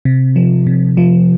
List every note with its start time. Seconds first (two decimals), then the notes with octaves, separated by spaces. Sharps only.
0.05 C3
0.36 F3
0.67 C3
0.97 F3